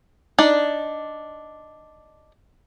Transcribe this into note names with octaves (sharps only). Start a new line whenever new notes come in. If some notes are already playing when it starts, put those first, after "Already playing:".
D4 D#4 D5